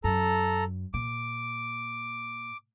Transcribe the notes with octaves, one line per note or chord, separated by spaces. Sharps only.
F#2 A4 A#5
A#2 D6